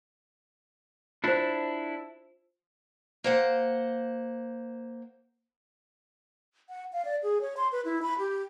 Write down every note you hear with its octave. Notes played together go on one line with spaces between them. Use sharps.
D4 E4 F4 C5
A#3 C5 F#5
F#5
F5
D5
G#4
C#5
C6
B4
E4
B5
G4